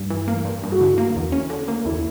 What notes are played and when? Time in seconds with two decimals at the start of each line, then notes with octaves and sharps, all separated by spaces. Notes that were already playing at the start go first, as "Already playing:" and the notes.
Already playing: G2
0.10 E3
0.28 A#3
0.45 G2
0.63 G2
0.72 F#4
0.80 D3 E4
0.98 A#3
1.16 E2
1.32 C#4
1.50 D3
1.68 A#3
1.86 E2 E4